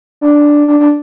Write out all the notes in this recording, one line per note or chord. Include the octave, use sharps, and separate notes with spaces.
D4
D4
D4